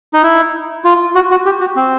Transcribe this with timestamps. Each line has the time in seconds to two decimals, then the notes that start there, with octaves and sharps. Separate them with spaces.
0.14 D#4
0.23 E4
0.84 F4
1.15 F#4
1.31 F#4
1.46 G4
1.60 F#4
1.76 C4